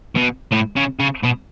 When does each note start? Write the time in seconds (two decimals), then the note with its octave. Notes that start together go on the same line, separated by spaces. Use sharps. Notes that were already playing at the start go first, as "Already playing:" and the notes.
0.15 B2
0.52 A2
0.76 C#3
1.00 C#3
1.24 B2